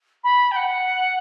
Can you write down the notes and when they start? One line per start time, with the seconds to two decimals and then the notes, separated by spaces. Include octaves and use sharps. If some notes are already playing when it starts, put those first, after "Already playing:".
0.23 B5
0.51 G5
0.56 F#5